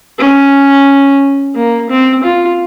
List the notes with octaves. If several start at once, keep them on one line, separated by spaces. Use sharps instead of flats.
C#4
A#3
C4
F4